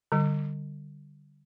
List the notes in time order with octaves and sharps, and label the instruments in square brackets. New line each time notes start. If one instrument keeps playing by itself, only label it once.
[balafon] D3 G3